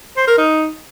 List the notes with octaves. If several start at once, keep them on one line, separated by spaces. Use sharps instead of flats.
C5
A#4
D#4